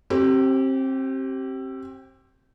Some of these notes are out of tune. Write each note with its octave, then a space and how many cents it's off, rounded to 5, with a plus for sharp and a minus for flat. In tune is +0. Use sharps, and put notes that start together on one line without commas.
C4 +30 G4 -25